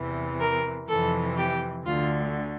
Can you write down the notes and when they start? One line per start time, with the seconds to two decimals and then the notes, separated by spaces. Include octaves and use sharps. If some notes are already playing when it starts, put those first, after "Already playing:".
Already playing: E2 C3 E3
0.40 A#4
0.88 F2 C3 E3 A4
1.37 G4
1.85 D2 D3 F4